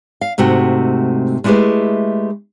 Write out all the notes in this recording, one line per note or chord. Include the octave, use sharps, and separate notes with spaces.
F5
G#2 C3 A3 F#4 F#5 G5
G#3 A3 E4 G4 G#4 B4